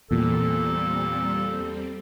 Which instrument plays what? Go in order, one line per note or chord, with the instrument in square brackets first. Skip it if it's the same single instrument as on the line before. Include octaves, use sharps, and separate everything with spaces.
[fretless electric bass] E2 [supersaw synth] A#2 [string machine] G3 C4 [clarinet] A4